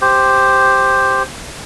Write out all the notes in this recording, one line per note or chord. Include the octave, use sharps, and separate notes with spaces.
G4 C5